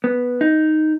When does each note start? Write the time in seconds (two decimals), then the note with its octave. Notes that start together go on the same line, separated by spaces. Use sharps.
0.04 B3
0.41 D#4